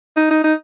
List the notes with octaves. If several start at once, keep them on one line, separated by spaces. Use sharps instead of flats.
D#4
D#4
D#4